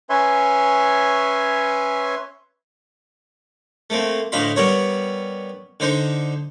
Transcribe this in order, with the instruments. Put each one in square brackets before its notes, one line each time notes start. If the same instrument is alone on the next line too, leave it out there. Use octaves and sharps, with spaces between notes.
[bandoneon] C#4 B4 C#5 E5 G#5 C6
[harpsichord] A3 A#3 C4
D2 A2 D#5 F5 B5 C6
G3 B3 A#4 C#5
D3 D#4 C5